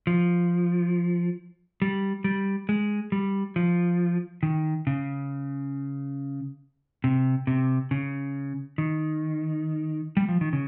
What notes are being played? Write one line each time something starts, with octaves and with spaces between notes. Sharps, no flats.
F3
G3
G3
G#3
G3
F3
D#3
C#3
C3
C3
C#3
D#3
G3
F3
D#3
C#3